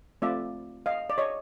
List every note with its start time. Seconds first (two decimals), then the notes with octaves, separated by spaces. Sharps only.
0.22 A3 C4 F4 D5 E5
0.86 D#5 F5
1.10 D5
1.18 C#5 D#5